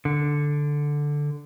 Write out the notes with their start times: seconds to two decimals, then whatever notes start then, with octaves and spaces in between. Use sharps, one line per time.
0.05 D3